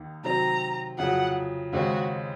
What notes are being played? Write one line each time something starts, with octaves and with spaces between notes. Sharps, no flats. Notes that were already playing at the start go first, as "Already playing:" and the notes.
Already playing: D#2 D#3 A#3 D#4
C3 D#3 F#3 C4 A#5
F2 C#3 F#3 F#5
D#2 C#3 G#3 C4 F#4